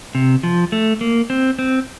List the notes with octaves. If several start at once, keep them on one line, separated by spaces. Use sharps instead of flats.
C3
F3
A3
A#3
C4
C4